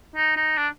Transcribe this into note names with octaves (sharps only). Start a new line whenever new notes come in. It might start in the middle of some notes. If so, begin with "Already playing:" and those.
D#4
D#4
D4